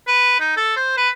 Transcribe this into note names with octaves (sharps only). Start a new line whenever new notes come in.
B4
D#4
A4
C5
B4